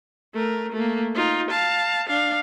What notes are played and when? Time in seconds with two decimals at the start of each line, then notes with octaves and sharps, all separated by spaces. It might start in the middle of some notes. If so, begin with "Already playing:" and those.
0.34 A3 A#4
0.72 A3 A#3
1.15 D#4 F4
1.51 F5 A5
2.08 D4 F5